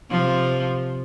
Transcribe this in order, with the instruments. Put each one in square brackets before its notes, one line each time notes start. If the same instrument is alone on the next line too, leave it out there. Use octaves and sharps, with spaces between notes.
[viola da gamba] C3 F3